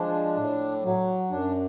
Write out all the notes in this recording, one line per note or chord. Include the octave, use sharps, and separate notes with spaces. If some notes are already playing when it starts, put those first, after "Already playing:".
Already playing: F3 G#3 D4
A2
F#3
F#2 D4